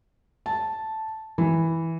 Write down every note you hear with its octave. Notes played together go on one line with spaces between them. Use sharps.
A5
E3